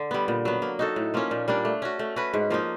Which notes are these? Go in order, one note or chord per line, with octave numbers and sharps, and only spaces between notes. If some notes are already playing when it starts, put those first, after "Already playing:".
Already playing: D3
G3 B3
A#2
F#3 B3
A#3
D#4 F#4 A4
A2
F3 A#3 C#4
A#2
G3 A#3 D4
A3
C#4 F#4
A3
C#4 F#4 B4
G#2
F3 A#3 D#4